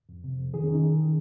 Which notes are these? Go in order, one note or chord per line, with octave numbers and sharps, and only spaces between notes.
F2
C3
F2
D#3 G#4
C#4
D#3 D#4
D#3